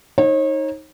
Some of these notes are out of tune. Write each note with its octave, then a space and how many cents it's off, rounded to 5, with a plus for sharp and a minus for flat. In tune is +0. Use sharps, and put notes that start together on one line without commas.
D#4 +10 C#5 -35